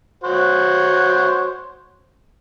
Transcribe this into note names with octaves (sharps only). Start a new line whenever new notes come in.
F#4 C5 C#5